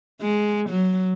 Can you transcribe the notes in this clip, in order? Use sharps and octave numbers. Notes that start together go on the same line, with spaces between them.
G#3
F#3